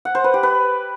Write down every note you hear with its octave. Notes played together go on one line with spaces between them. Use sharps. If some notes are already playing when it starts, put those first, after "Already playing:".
F#5
C5
B4
G4
B4